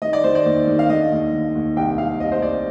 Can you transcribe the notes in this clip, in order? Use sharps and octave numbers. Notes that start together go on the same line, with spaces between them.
D#3 D#5
D5
D#3 C5
D5
D#2
D#3
F5
D3 D#5
D#2
D3
D#2
C2 G5
C2 F5
C2 D#5
C5
C2 D5